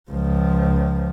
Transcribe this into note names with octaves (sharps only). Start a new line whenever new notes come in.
C#2 F3